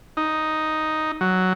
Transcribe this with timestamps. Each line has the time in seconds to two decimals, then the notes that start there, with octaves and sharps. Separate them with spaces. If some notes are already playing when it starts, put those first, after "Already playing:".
0.17 D#4
1.21 F#3